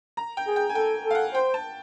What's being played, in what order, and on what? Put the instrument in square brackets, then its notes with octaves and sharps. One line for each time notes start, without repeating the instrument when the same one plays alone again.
[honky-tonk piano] A#5
G5
[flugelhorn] G#4
[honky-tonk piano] G5
G#5
[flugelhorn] A4 [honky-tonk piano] G5
[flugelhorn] A4
[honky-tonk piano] F5
F#5
[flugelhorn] C5 [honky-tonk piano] G5
[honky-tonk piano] A5